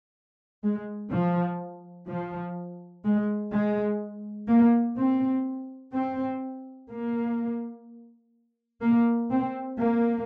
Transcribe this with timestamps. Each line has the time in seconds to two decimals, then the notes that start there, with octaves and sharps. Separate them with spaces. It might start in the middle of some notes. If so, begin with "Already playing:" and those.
0.63 G#3
1.12 F3
2.07 F3
3.05 G#3
3.52 G#3
4.49 A#3
4.97 C4
5.94 C4
6.90 A#3
8.82 A#3
9.31 C4
9.79 A#3